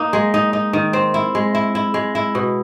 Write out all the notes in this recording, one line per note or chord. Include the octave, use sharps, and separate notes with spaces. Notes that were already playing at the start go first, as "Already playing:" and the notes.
Already playing: A#3 D#4
G#3
D#4
D#4
D#3
C4
E4
G#3
E4
E4
G#3
E4
B2